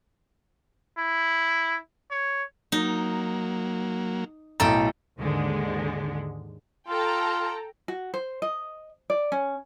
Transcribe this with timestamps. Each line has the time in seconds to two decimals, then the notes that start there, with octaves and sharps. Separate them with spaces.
0.98 E4
2.11 C#5
2.72 F#3 A#3 D#4
4.60 B1 A2 A4 G5 A#5
5.20 D#2 G#2 D3 G#3
6.88 F4 A4 G5 A#5
7.88 F#4
8.14 C5
8.42 D#5
9.10 D5
9.32 C#4